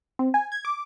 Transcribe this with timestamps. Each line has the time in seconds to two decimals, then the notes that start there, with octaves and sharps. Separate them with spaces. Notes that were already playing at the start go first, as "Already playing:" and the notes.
0.19 C4
0.34 G#5
0.52 G#6
0.65 D6